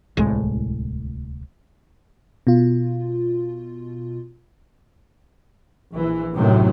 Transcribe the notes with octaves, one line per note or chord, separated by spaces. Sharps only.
D1 C2 A2 G#3
B2 F4
A#1 E3
A1 F#2 A2 C3 D#3 F#3